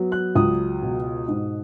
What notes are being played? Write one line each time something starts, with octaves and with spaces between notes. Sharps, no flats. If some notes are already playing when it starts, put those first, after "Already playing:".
Already playing: F#3 B3
F#6
C#2 D#6
B2
G#2